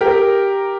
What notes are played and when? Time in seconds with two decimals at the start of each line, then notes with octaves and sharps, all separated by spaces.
0.01 G4 A#4